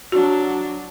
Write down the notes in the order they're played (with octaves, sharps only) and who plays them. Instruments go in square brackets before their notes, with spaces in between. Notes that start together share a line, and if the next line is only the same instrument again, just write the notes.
[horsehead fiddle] F#3 D4 [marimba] F#4